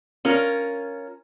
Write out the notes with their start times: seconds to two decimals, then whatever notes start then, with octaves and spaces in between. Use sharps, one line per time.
0.25 C#4 F4 A#4